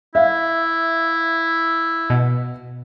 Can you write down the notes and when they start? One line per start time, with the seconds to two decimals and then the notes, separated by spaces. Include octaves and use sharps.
0.15 E4 E5 F5
2.10 B2